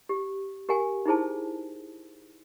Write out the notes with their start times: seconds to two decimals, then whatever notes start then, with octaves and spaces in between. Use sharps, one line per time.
0.09 G4
0.69 G4 A#4 F#5 G#5
1.06 D#4 E4 G#4 C5 A5